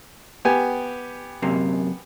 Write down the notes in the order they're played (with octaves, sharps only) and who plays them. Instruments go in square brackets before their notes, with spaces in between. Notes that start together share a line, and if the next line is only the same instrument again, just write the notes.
[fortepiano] B3 G4 G#5
[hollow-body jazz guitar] F#2 C3 A#3